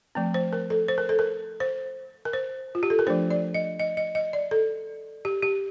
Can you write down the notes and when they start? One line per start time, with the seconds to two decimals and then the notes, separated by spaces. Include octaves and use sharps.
0.15 F3 A3 C4
0.34 C5
0.53 A#4
0.70 A4
0.88 C5
0.98 A#4
1.09 A4
1.19 A#4
1.60 C5
2.25 A#4
2.33 C5
2.75 F4
2.83 G4
2.90 A4
2.99 A#4
3.07 F3 A3 D4 C5
3.30 D5
3.54 D#5
3.79 D#5
3.97 D#5
4.15 D#5
4.33 D5
4.51 A4
5.25 G4
5.43 G4